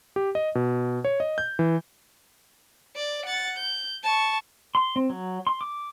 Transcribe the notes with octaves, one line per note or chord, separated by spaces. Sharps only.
G4
D#5
B2
C#5
D#5
G6
E3
D5
F#5 A6
G6
A5 C#6
C6
C4
F#3
C6
D6